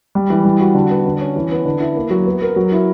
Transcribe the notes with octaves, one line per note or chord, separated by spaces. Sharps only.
G3
E3
G3
F#4
D3
B3
D3
C#4
E3
B3
D3
E4
A#3
F#3
B3
A#4
F#3
E4